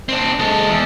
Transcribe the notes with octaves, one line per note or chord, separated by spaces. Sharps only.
C4 D4
G#3 A4
E2